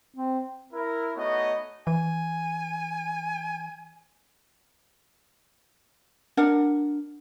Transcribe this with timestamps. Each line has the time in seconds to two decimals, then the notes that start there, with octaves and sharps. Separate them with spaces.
0.16 C4
0.74 E4 A#4
1.16 A3 B3 D#4 F#4 C#5 D#5
1.87 E3 G#5
6.37 D4 A#4 F#5